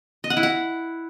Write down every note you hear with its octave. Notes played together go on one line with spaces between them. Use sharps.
D#5
F#5
E4
F#5